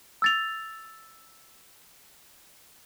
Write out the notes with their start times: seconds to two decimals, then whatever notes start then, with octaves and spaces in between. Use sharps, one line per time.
0.22 E6 A6 F7